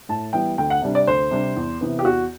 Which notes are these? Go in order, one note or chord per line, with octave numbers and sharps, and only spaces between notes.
A2 A5
E3 G3 B3 E4 G5
D2 G5
F#5
C3 G3 D4
D5
D2 C5
C3 G3 D4
E2
C3 E3 B3
G4
E2 F#4